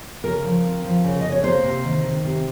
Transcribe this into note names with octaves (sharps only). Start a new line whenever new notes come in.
C#3 A#4
F3
C4
F3
C#3
C#3 D#5
C#5
A#3 C5
C3
D#3
D#3
C3